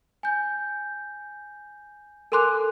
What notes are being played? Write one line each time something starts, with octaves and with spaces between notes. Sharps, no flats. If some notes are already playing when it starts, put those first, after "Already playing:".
G#5 G6
A4 A#4 G#5 C6 D6 F#6